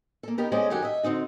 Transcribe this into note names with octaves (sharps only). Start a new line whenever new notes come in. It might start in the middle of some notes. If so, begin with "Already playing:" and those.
A#3 A4
B3 D#4 G4 A#4
G#3 C#4 A4 C5 D5 D#5
F#2 D#3 G4 A4 F#5 G#5
D#5 E5
D3 C4 D#4 F#4